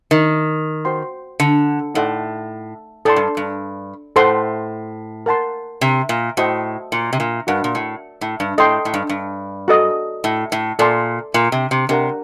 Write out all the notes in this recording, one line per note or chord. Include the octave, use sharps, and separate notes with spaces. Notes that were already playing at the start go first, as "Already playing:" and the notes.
D#3
F#4 C5 G5 C6
D3
A2 D#4 A4 D5 F#5 C6
A2 A4 D5 A5 C6
G2
G2
A2 A4 C5 F#5 C6
A#4 F#5 A5 C6
C3
A#2
A2 F#4 C5 D#5 G5 C6
A#2
C3
A#2
G2 F#4 A#4 F#5 A5
A#2
A2
A2
G2
A2 A4 D#5 G5 C6
A2
G2
G2
F#4 A4 D#5
A2
A2
A#2 A4 D5 A5 C6
A#2
C3
C3
C3 D4 G4 A#4 F#5 A#5